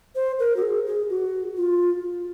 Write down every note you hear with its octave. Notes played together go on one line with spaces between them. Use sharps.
C5
A#4
F#4
G#4
G#4
F#4
F4